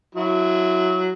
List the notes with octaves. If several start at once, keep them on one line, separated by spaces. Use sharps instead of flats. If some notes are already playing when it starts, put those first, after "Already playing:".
F#3 E4